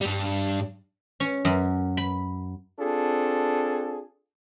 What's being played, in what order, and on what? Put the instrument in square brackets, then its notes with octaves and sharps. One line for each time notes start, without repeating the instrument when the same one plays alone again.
[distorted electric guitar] G2 G3
[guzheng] C#4
F#2
B5
[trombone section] C4 D4 F4 G#4 A4